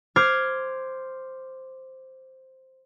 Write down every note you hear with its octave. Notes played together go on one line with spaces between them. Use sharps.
C5 D6 F6 G#6